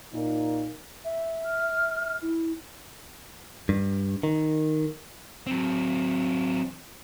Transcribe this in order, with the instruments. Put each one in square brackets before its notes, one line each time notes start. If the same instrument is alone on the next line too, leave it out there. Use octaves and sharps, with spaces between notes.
[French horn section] A#2 D#4 A#4
[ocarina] E5
[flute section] F6
[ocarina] E4
[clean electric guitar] G2
D#3
[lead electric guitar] F#3 C4